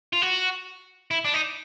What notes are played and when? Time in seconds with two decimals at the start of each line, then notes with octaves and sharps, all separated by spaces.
0.13 F4
0.22 F#4
1.11 E4
1.25 D4
1.34 D#4